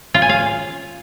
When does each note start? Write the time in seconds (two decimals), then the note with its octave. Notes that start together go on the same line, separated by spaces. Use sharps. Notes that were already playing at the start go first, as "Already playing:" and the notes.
0.14 F4
0.22 G#5
0.29 F5